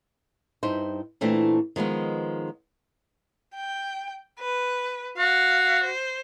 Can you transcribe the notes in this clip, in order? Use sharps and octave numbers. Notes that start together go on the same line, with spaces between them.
G2 D#4 E4 C5
A#2 E3 A3 C4 D4
D#3 F3 G#3 B3
G5
B4
F#4 F5
C5